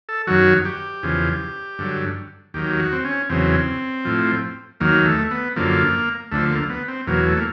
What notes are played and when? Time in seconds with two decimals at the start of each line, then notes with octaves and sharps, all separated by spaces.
0.09 A4
0.27 F#2 D#3 F#3 F#4
0.65 G4
1.03 E2 C#3 F3
1.78 G2 D3 F#3
2.54 D#2 D#3 F#3 G4
2.79 F#4
2.92 C4
3.05 C#4
3.30 E2 C#3 F#3 C4
4.05 A2 F3
4.80 D#2 D#3 F#3 A#3
5.06 A3
5.31 B3
5.56 F#2 D3 F3 A#3
6.31 D2 D3 F3 A3
6.51 A#3
6.70 B3
6.88 C4
7.07 E2 B2 F#3 A#3
7.26 A3
7.37 A#3